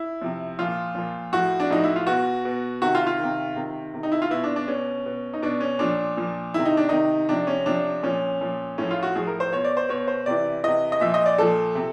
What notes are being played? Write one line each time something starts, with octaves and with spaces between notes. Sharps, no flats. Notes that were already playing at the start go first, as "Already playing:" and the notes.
Already playing: E4
C3 F3
A#2 F3 F4
A#2 F3
A2 F3 F#4
D4
A2 F3 D#4
E4
F4
B2 F#4
B2
C3 D#3 F#4
F4
F4
C3 D#3
C3 D#3
C3 D#3
D#4
E4
F4
B2 E4
D4
D4
B2 C#4
B2
D#4
B2 D4
C#4
A#2 F3 D4
A#2 F3
C3 D#3 E4
D#4
D4
C3 D#3 D#4
C3 F3 D4
C#4
C3 F3 D4
A#2 F3 C#4
A#2 F3
A2 F3 C#4
F4
F#4
A2 F3 G#4
A#4
C5
B2 C#5
D5
C5
B2 C#5
C5
C3 E3 D5
C3 E3 D#5
D#5
A#2 F3 E5
D#5
D5
A#2 F3 A4
C3